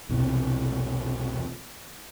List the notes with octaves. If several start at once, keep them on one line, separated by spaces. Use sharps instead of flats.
B1 E2 C3 E3